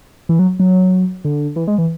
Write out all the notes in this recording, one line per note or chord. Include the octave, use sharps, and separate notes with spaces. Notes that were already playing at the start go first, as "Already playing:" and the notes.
E3
F#3
F#3
D3
E3
G#3
E3